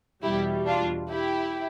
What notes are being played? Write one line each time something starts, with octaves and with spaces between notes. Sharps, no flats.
E2 B2 G3 E4 G4
D4 F4
E4 G4